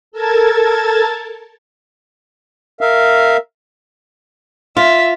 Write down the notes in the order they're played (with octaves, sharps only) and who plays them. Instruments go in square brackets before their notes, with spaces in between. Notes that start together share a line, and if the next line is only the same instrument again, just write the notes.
[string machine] A4 A#4 A5 G#6 A6
[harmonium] A#4 E5 F5
[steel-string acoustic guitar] F4 [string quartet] E5